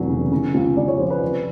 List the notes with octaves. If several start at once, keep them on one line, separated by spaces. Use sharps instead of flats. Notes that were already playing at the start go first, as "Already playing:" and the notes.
Already playing: F1 E2 F#3
C#3
C#3
C#2
C#2 D5
C#5
F3 C5
B4
C3